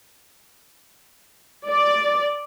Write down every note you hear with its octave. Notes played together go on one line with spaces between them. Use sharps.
D5